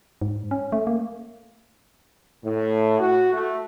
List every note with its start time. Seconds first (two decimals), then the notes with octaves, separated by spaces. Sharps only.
0.22 G#2
0.51 C#4
0.72 A3
0.87 A#3
2.44 A2
2.99 F#4
3.33 A3